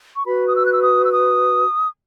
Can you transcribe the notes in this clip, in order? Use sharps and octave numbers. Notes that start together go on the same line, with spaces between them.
C#6
F#4 B4 B5
D#6
E6
F#6
E6
D#6
E6
D#6